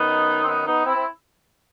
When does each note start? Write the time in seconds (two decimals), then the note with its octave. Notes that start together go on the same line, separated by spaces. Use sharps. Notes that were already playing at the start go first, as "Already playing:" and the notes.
Already playing: F#2 D#3 B3 D#4
0.43 C4
0.47 B3 D#4
0.66 B3 D#4
0.85 C4 E4
0.96 C4